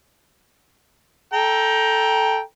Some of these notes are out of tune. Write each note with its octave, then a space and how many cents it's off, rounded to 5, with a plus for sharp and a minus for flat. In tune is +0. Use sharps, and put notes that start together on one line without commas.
A4 +0 G5 +0 A#5 +20